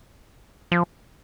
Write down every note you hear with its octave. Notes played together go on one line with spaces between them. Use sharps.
F3